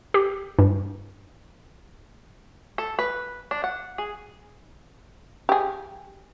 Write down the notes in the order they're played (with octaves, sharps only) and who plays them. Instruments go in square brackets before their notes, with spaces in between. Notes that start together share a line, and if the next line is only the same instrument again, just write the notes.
[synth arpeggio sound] G4
G2
[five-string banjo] A4
B4
D4
F#5
G#4
[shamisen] G4 G#4